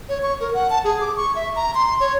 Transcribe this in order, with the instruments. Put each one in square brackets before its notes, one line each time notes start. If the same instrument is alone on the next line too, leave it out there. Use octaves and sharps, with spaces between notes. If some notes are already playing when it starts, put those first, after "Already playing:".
[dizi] C#5
C#6
A#4
F#5
A5
G#4
D6
C#6
E5
A#5
C6
C#5